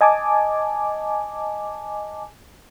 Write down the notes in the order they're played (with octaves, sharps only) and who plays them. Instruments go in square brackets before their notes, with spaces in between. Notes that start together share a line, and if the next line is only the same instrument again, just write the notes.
[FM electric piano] D#5 G#5 A5 D6